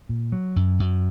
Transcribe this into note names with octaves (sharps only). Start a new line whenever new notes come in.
A#2
F#3
F#2
F#2